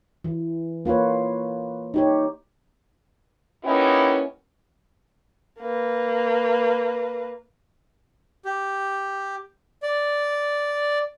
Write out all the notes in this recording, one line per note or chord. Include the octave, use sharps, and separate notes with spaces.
E3
A#3 F4 B4 C#5
D#4 G4 C#5
A#3 B3 C#4 D#4 E4 G4
A#3 B4
G4
D5